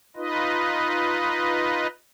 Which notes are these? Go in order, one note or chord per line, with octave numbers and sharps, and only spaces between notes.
D#4 F4 B4 D#5